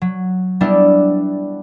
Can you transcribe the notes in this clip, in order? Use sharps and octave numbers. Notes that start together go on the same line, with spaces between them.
F#3
G3 B3 D4 E4